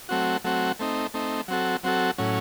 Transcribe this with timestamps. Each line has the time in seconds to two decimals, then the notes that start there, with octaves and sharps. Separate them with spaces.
0.09 F#3 A3 C4 F#4
0.44 F#3 A3 C4 F#4
0.79 A3 C4 D#4
1.14 A3 C4 D#4
1.48 F#3 C4 F#4 A4
1.84 F#3 C4 F#4 A4
2.18 A2 F#3 C#4